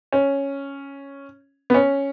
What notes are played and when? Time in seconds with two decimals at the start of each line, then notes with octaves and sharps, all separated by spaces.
0.12 C#4
1.70 B3
1.74 C#4